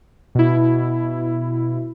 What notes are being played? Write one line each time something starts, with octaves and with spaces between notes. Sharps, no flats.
B2 E4